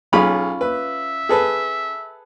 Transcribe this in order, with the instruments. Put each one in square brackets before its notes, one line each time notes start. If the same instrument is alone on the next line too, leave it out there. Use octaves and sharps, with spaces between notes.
[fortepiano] B1 G#4 [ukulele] C#4 F4 B5
[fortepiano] B4 [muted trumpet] E5
[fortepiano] G#4 A4 B4